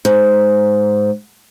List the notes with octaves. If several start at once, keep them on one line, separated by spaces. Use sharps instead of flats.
G#2